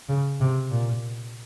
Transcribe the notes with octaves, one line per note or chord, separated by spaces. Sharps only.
C#3
C3
A#2